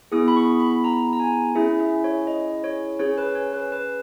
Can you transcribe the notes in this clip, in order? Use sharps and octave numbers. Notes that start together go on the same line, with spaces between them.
B3 E4 G#4 D#6
B5
C#6
B5
A#5
A#5
G#5
C#4 E4 G#4 E5
E5
C#5
D#5
C#5
C#4 G#4 C#5
B4
C#5
B4
B4